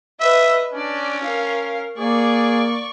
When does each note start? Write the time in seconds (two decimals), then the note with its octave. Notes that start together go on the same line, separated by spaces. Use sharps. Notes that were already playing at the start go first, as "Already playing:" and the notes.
0.20 B4 D#5 E5
0.73 C#4 D4 D5
1.23 A#4 F5
1.98 A#3 G#4 D5 C#6